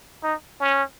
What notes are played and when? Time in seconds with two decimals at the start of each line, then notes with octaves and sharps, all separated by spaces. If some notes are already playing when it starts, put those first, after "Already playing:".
0.23 D#4
0.60 C#4